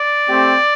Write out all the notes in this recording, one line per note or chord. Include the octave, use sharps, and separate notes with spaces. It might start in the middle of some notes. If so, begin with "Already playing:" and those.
Already playing: D5
A3 C4 G4